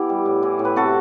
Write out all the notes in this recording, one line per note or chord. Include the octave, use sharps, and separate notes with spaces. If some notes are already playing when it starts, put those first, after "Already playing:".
Already playing: E3 B3 E4 G4
G3
A2
E3
A2
B4
C3 F#4 A4